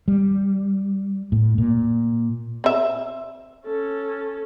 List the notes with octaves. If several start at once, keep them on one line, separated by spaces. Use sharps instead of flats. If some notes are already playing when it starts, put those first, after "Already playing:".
G3
A2
A#2
C4 E5
C#4 A4